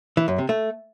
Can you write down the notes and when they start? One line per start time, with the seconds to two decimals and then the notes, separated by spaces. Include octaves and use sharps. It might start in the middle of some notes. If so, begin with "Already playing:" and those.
0.17 E3
0.28 F#2
0.38 C3
0.49 A3